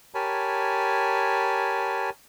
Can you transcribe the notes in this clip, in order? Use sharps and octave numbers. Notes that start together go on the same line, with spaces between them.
G4 A#4 C#5 G#5 A5 B5